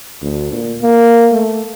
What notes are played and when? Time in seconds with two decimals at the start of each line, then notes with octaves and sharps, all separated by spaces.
0.22 D2
0.52 A#2
0.82 A#3
1.32 A3